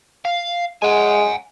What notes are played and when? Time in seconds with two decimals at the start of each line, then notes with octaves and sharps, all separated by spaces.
0.25 F5
0.82 G#3 F#5 G#5